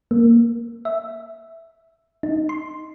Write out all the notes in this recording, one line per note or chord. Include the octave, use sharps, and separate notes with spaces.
A#3
E5
D#4
C6